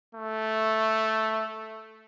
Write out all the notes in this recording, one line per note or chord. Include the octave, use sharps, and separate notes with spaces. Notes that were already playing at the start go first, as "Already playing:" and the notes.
A3